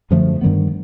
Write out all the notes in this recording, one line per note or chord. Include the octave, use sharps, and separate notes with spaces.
F#2 D3 F3 A3
G2 D#3 G3 B3